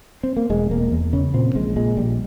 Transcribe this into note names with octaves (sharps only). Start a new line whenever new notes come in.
C4
A#3
E1 G#3
E1 A#3
E2
C#3 C#4
A#2 C4
A#1 G#3
A#2 G#3
A#1 G3